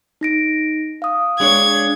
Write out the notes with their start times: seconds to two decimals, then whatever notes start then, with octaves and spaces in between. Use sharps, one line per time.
0.21 D#4 A#6 D7
1.02 F5 D#6
1.40 G#3 D4 C#5 G#6